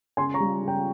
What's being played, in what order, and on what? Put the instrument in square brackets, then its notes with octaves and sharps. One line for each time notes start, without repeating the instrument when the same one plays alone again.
[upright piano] C#3 G#5 C6
A#5 C#6
G3
C#3
G5 A#5